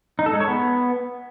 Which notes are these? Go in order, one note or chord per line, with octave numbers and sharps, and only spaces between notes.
D#4
A4
G#3
C#5
B3